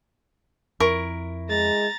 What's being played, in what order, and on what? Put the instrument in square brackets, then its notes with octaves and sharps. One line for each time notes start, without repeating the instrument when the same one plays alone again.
[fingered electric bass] F2 [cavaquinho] E4 A#4 C#6
[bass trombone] G#3 [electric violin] A#5 A6